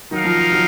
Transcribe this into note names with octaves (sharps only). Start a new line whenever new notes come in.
D#3 F#3 D#4 A#4 F5
F3
F3
D#3 F#3